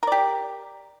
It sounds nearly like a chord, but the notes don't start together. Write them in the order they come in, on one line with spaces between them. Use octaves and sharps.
A#4 D5 G4